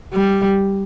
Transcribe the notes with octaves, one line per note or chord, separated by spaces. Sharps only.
G3